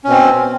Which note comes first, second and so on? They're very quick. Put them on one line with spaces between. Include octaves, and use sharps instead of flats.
C#4 B2 C4